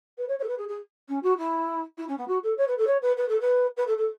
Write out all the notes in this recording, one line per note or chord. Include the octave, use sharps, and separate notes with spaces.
B4
C#5
C#5
A4
B4
G#4
G#4
C#4
F#4
E4
E4
C#4
B3
F#4
A4
C#5
B4
A4
C#5
B4
B4
A4
B4
B4
A4
A4